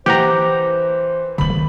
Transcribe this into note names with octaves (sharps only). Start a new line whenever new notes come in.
E3 G4 C5 F#5 A#5
D#3 C4 B5 F#7